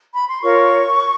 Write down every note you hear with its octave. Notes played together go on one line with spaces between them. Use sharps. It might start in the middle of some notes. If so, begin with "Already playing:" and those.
B5
C6
F4 A#4 C#5 C#6